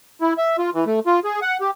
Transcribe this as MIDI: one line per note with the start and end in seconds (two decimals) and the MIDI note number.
0.21 0.33 64
0.38 0.57 76
0.58 0.70 65
0.74 0.84 52
0.86 1.00 57
1.06 1.20 65
1.24 1.40 68
1.42 1.57 78
1.61 1.71 67